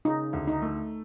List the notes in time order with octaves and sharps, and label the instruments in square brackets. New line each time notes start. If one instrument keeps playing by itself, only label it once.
[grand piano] C#3 [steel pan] D#4
[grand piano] D2
[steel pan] D#4
[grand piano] A3